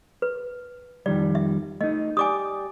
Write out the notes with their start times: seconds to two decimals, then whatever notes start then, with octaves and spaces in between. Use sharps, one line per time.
0.22 B4
1.06 F2 D#3 G3 D5
1.35 E5
1.81 A3 D#4 D#5
2.17 G4 D5 G#5 D6 D#6